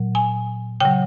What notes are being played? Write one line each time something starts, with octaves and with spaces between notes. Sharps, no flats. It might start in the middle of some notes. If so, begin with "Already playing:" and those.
Already playing: A#2 F#3
G#5
C#3 F#3 G5